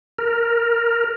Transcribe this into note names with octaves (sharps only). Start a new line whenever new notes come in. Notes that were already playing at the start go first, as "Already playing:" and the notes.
A#4